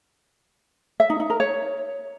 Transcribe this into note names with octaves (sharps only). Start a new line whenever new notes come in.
E5
D#4
D#4
A#4
C#5